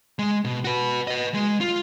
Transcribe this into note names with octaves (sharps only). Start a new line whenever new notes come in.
G#3
B2
F#4 B4
B4 D#5
G#3
F4